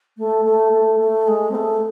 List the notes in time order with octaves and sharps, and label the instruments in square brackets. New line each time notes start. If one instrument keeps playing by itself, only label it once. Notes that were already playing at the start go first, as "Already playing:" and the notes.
[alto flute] A3
A3
A3
A3
G#3
C4
A3